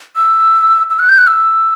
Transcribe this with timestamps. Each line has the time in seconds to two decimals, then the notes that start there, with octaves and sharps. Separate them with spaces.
0.16 E6
0.90 E6
0.99 F#6
1.09 G6
1.18 F#6
1.27 E6